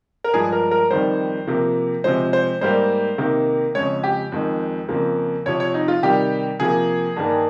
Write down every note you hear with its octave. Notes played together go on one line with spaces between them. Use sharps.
A#4
G2 F3 G#3 G#4
A#4
A#4
F2 D#3 G3 C5
C3 F3 A#3
C3 F3 G#3 C5
C5
G#2 G3 A#3 C5
C3 D#3 A#3
F2 C#3 G#3 C#5
G4
F2 D#3 G#3
F2 C#3 F3 A#3
F2 C3 F3 C#5
C#5
D#4
F4
C3 D#3 G3 G4
C3 F3 A#3 G#4
G2 D#3 G3 A#3